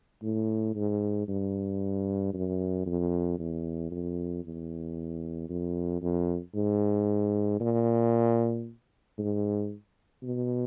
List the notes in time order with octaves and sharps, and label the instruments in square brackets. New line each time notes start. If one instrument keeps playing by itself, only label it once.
[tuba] A2
G#2
G2
F#2
F2
E2
F2
E2
F2
F2
G#2
A#2
G#2
B2